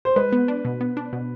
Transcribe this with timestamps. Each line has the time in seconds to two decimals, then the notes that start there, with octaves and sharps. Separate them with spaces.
0.05 C5
0.16 G#3 B4
0.32 B3
0.48 D4
0.65 B2
0.81 B3
0.97 D4
1.13 B2